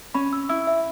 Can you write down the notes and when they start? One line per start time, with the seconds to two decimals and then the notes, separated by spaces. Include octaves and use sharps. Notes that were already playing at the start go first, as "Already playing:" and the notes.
0.14 C#4 B5
0.33 E6
0.49 E4 E6
0.67 E5